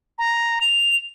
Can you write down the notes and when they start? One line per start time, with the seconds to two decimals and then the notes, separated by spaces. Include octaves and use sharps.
0.19 A#5
0.61 F7